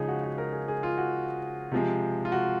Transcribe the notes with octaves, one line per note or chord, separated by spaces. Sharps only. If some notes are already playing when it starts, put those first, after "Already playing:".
Already playing: C#3 F3 G#3 D#4 G#4
F#4
F#4
A#4
G#4
G#4
F4
F#4
C3 F3 G#3
F4
F#4